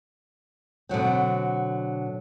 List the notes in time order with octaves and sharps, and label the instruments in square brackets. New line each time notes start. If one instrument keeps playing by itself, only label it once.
[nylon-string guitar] B2 D3 F#3 C4